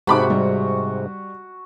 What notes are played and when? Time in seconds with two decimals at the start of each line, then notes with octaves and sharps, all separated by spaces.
0.07 G#2 C3 F#4 A5 B5 D6
0.30 G3